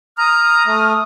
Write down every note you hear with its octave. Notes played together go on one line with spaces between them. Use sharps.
A#5 D#6 F6
A3